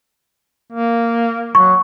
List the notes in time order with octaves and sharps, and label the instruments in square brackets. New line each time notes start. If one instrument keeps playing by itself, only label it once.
[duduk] A#3
[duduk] F#3 [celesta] C#6